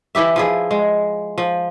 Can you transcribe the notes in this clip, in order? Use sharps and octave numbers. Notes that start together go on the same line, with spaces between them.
E3 E4 G4 E5
F3 E4 G#4
G#3
F3